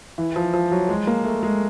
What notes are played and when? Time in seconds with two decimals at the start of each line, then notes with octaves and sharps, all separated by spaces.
0.18 E3
0.36 F3
0.54 F3
0.72 F#3
0.89 G#3
1.07 A#3
1.25 A3
1.43 G#3